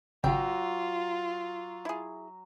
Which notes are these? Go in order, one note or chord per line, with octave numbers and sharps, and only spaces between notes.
G#1 C#3 F#3 F4 G5
E4 G#4